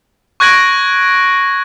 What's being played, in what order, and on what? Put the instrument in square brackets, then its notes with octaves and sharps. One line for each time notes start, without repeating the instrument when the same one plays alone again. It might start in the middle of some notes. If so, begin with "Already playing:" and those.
[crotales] C#6 F#6 G#6 A#6 D7 F#7